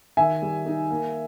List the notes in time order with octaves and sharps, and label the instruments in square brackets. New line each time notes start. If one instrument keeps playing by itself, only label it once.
[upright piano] D#3 E5 G#5
G3
D#4
A#3